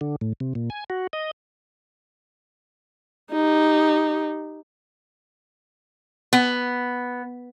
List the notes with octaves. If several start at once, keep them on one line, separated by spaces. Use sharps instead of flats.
D3
A2
C3
A#2
G#5
F#4
D#5
D#4 G4
B3